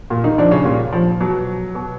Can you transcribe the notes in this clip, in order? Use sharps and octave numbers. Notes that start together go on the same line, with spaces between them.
A#2
D#3 D#4
D3 F3 D4
C#3 C#4
A#2 G3
F3
B2 F#3
B2